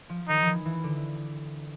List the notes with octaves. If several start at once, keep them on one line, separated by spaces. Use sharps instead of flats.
F3
D#3 D#4
E3 F3
E3
D3